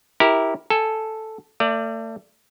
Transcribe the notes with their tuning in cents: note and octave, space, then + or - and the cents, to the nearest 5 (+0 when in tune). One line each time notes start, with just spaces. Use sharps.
E4 -20 G4 +0 A#4 +0
A4 +0 G#5 -5
A3 +35 D5 +0